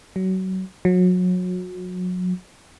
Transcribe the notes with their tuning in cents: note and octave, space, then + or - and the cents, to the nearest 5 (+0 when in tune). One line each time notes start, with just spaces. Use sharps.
F#3 +25
F#3 -30